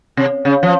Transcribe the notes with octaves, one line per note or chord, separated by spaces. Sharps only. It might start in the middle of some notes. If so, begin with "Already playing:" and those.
C3
C#3
F3